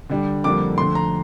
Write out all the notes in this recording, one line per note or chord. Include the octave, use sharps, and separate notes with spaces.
D3 G3 D4
F2 D3 G3 A#3 D4 D6
F2 D3 A3 C6
A#5